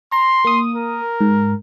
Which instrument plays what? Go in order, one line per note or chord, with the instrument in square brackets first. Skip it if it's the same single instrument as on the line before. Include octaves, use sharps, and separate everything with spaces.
[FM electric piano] A#5 [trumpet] C6
[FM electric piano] A#3 D#6
[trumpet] A#4
[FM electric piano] G#2